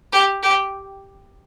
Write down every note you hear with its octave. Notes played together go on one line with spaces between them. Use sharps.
G4
G4